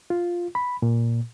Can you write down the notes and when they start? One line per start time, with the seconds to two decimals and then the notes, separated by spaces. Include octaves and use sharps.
0.10 F4
0.55 B5
0.82 A#2